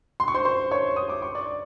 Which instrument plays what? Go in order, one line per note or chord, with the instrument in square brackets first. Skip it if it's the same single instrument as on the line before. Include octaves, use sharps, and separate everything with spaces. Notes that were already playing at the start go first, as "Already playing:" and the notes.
[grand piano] C6
C#6
C5 C6
C5 C6
C#5 C#6
D#6
D6
C#6
D5 D6